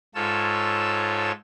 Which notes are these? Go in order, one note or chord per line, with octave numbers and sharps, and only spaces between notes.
G#2 F4 A4 C#5 E6